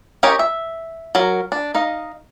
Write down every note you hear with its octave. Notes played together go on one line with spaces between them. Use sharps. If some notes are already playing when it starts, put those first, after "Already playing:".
C#4 G4 A#4 C#5 D#5
E5
F#3 A#4
D4
D#4 D#5 F5